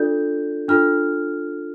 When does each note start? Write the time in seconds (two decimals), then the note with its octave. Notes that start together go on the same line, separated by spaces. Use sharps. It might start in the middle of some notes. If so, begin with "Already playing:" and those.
Already playing: D4 F4 A4 D5 G6
0.68 D4 F4 A4 F6